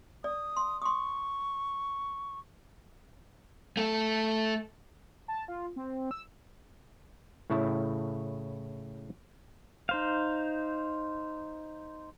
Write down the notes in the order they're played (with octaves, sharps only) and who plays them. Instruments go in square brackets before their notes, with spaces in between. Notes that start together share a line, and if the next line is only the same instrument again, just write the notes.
[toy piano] D5 [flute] D#6
[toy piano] C6
[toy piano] C6 D#6 [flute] C#6
[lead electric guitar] A3 A4
[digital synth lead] A5
F4
C4
E6
[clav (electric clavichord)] A2 C#3 E4 A5
[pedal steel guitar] D#4 C5 F5